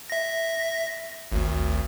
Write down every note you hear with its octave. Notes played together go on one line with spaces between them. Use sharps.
E5 A#6
G#1 D2